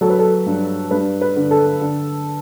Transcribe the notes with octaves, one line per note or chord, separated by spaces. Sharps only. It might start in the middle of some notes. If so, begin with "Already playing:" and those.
F#3 A4
B4
A4
G2
G2 B4
B4
D3
A4
D3